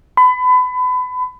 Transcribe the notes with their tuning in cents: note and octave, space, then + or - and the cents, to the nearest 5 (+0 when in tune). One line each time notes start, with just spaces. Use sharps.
B5 +30